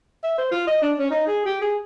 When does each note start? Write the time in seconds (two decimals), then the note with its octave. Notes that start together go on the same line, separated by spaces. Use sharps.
0.23 E5
0.38 C5
0.51 F4
0.67 D#5
0.82 D4
0.99 C#4
1.10 D#4
1.27 G#4
1.45 G4
1.61 G#4